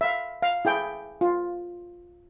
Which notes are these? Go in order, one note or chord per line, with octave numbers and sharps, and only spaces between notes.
E5 F5
F5
E4 G#4 G5
F4